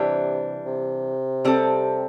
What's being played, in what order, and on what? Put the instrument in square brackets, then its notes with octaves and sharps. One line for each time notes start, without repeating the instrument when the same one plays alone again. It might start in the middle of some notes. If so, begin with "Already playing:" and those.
Already playing: [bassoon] C3 [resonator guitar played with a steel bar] E3 G3 D4
[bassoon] C3
[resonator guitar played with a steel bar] G3 C4 A4